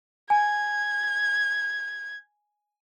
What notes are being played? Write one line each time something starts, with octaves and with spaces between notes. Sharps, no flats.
G#5 G#6